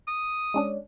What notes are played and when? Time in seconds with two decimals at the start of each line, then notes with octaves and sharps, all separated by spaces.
0.08 D#6
0.54 G#3 C#4 D4